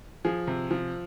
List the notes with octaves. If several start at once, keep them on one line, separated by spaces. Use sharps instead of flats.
F3 G#4
C3
F3